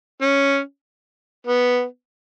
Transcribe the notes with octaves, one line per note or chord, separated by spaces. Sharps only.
C#4
B3